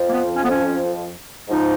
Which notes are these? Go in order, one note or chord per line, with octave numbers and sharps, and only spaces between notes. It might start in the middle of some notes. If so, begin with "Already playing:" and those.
Already playing: F2 F3
A#3
B3
C#4
B3
C#4
G#2 F3 D#4